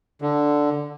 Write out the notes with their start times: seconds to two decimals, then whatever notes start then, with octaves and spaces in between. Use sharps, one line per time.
0.22 D3